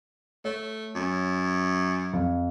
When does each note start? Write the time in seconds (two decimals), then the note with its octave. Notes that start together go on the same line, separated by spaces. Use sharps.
0.45 A3 C#5
0.95 F#2
2.13 F2